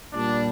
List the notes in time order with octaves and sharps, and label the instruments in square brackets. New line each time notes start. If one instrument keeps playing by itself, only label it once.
[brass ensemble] A#2 G3 D4